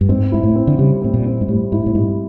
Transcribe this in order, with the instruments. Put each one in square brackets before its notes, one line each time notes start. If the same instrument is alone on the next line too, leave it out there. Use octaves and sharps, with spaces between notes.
[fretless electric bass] G2
[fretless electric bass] G#2 [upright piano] C4
[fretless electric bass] G#2 [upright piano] E4
[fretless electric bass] A2
[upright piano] C4
[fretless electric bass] D3
[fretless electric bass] C#3 [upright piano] G3
[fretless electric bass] A2 [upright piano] C4
[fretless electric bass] A#2
[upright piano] C4
[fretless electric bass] G#2
[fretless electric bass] A2 [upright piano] G3
[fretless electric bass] G#2 [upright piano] E4
[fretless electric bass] A2
[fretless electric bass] G#2 [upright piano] G3